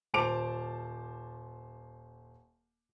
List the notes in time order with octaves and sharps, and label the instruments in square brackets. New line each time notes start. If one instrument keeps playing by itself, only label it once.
[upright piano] D#1 C5 A5 D6 D7 F7